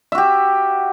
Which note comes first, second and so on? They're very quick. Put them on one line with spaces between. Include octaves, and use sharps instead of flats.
E5 F#4 G4